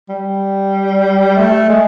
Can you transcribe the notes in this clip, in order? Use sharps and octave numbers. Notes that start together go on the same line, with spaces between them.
G3
A3
G#3